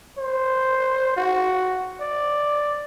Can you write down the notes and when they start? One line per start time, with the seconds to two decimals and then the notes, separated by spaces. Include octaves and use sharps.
0.18 C5
1.17 F#4
2.00 D5